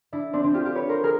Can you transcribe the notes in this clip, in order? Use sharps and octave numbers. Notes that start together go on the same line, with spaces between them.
D4 E4
C4 D4
C4 D4
F4 G4
F4 G4
B4 C#5
A#4 C5
G#4 A#4